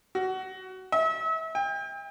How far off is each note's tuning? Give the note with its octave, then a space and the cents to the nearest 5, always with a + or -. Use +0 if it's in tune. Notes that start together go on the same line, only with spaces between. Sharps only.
F#4 +20
E5 -35
G5 +35